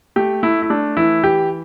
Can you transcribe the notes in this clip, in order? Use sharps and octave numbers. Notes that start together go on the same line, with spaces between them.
A3 G4
A3 E4
E4
A3 D4
E3 E4
E3 G4